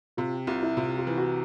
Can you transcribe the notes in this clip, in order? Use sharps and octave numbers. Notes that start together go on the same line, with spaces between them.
C3 F4
C2 F4
E4
C3 F4
F4
E3
F#4